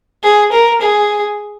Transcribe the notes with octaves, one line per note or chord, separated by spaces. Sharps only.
G#4
A#4
G#4